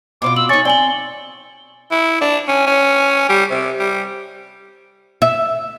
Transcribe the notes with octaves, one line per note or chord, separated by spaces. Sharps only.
B2 C4 F4 D6
E6 F#7
C#4 D#4 C#6 A6
C4 D5 G#5 F#7 G7
E4
D4
C#4
C#4
G3
C3
G3
E5